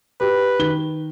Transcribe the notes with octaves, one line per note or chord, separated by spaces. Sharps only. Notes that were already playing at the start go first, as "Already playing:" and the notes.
G4 B4
D#3 G7